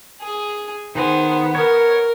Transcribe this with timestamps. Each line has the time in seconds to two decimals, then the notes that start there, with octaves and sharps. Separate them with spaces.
0.21 G#4
0.95 D#3 B3 G#4 C5
1.55 A#4 C#5